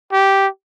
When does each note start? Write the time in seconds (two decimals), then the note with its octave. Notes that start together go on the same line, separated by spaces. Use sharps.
0.12 G4